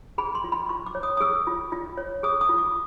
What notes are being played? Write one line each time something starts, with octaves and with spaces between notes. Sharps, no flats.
G#4 B5
C6
F4
B5
F4 C#6
D6
C#5
D#6
D#6
G#4 E6
F4
F4
C#5
G#4 D#6
D#6
F4
D6